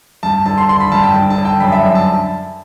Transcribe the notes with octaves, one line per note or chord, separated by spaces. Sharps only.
G2 A5
D3 A5
C6
D3 C6
B5
G2 A5
G5
D3 A5
A5
D3
G5
F#2 B5
E5
F#2 E5
A5